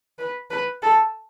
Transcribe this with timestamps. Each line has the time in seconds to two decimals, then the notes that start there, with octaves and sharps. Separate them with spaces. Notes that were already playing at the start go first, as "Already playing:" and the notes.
0.19 B4
0.50 B4
0.83 A4